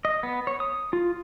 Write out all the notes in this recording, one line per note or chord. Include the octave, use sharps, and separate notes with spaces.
D#5
B3
C#5
D#6
F4